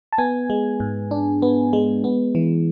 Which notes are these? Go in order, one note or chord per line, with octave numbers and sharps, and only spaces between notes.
A5
B3 G#5
G#3
G#2
D4
B3
G#3
B3
E3